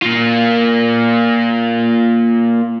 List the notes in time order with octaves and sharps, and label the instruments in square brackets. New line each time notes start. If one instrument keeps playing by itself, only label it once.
[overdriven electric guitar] A#3 F4